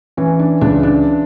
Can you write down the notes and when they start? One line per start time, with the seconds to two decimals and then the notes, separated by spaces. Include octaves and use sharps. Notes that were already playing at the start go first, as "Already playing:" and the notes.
0.17 E3 C#4
0.39 D4
0.61 C#2 D4
0.83 D4